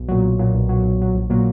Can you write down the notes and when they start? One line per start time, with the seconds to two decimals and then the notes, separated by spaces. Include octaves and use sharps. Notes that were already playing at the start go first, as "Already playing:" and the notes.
Already playing: B1
0.09 A#2 F#3
0.23 B1
0.39 A#2 F#3
0.54 B1
0.69 A#2 F#3
0.84 B1
1.00 A#2 F#3
1.15 A#1
1.30 A#2 F#3 A#3